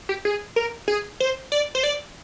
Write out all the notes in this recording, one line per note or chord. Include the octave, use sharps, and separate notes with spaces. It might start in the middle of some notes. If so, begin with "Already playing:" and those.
G4
G#4
A#4
G#4
C5
D5
C5
D5